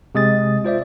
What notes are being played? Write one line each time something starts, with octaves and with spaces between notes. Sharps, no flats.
C3 G#3 D#6 A6
F4 C5 D5 E5